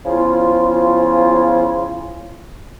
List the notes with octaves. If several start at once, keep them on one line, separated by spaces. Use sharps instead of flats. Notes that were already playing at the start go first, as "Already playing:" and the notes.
C#3 F3 B3 E4 F4